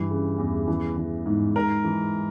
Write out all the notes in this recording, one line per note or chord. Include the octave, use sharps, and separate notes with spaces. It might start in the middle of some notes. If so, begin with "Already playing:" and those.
Already playing: G2 E3
C#3
E2
E3
E3
G#2
G#2 A#4
E3